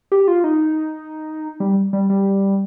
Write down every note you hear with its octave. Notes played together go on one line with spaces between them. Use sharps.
G4
F4
D#4
G3
G3
G3